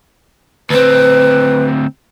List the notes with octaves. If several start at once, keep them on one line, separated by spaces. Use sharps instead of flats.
D2 C4 B4